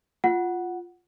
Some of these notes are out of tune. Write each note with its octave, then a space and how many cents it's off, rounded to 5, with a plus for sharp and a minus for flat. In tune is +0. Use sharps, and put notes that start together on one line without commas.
F4 +0 F#5 +0